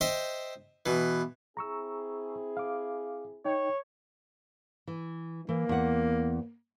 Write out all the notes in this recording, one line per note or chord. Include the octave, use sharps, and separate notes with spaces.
C5 D#5 E5 G5
B2 E3
C4 E4 G#4 A#5 C#6 E6
F5 D6
D#4 C#5 G5
E3
E3 A#3
E2 F#5